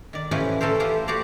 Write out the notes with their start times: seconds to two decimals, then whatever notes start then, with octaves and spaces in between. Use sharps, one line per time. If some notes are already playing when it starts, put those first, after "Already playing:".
0.13 D#3 D5
0.31 A2 E3 F3 C#4 G4 B4
0.61 E3 A3 A4 A#4 C5
0.80 F4 G4 B4 C5
1.07 F#4 G4 C5 D5 F5